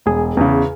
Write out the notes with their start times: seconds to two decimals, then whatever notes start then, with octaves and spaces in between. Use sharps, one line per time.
0.06 E1 G#4
0.37 E2 C#3